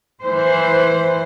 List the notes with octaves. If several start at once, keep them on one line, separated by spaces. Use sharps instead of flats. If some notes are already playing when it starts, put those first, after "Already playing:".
E3 C5